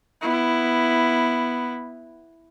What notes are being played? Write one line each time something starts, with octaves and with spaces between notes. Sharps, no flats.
B3 E4